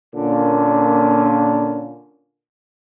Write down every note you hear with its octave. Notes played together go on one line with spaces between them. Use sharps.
A#2 D3 A#3 C#4 F4